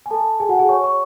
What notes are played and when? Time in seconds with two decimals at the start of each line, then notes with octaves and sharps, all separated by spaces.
0.06 G#5
0.10 A4 A5
0.40 G#4 G#5
0.49 F#4 F#5
0.59 G#4 G#5
0.69 C#5 C#6
0.83 C#5 C#6